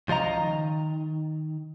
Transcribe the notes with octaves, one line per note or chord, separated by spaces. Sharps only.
C#2 F3 F4 D#5 A#5
D#3